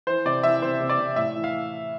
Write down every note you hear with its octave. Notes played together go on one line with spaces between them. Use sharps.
E3 C5
C3 D5
E3 E5
C3 C5
C3
D5
C3
A2 E5
E3
F5